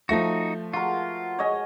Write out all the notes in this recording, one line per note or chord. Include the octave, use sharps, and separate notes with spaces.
F3 A3 D#4 F#4 A#6
F4 F#4 A#4
C#5 D#5 G#5